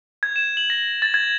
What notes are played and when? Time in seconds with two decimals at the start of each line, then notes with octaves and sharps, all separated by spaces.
0.23 G#6
0.36 E7
0.57 F#7
0.70 A#6
1.02 A6
1.14 G#6